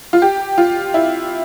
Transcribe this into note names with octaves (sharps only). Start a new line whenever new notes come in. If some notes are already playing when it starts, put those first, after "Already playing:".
F4
G4
F4
E4